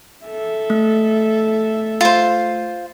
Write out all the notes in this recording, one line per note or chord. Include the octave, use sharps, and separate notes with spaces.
A4 E5
A3
F4 C5